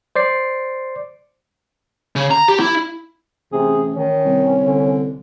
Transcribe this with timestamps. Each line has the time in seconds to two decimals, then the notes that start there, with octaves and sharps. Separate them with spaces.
0.16 C5 D5 C7
2.16 C#3
2.31 A#5
2.48 G4
2.60 E4
3.52 A1 C3 G#4
3.96 D#3 C#4
4.25 C2
4.59 D3